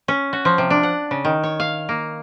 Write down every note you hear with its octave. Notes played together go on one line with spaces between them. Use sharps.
C#4
F#4
F3
C3
D4
F#5
C#3
D#3
C#5
F5
A#3